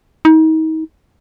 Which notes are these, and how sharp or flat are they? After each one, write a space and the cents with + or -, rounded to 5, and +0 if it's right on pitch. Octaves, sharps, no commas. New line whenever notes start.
D#4 +35